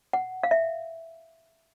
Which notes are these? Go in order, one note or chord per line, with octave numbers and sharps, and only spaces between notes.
F#5
F5
E5